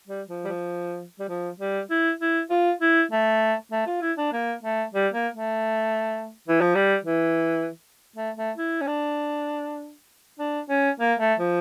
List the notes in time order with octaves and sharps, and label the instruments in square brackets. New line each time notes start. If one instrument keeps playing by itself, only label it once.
[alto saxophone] G3
F3
G3
F3
G3
F3
G3
E4
E4
F4
E4
A3
A3
F4
E4
D4
A#3
A3
G3
A#3
A3
E3
F3
G3
E3
A3
A3
E4
C#4
D4
D4
C#4
A#3
A3
F3